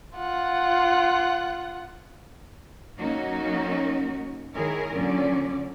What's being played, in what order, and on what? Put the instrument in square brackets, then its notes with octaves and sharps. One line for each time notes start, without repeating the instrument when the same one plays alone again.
[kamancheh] F4 F#5
[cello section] F#3 A#3 C#4 D#4 F#4 A#4
D#3 E4 G#4 A#4 C#5
A#2 D3 F#3 C#4 D5